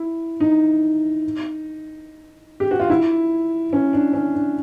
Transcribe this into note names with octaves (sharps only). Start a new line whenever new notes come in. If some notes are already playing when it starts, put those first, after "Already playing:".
Already playing: E4
D#4
G4
F#4
F4
E4
C#4
D4
C#4
D4